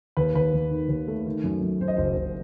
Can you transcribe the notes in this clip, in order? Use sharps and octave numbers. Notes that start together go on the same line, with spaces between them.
D#2 B4
D#2 B4
D#2
D#3
D#2
A3
D#3
F#2
F#2
F#2 C5
D#5
F#1 C5
F#1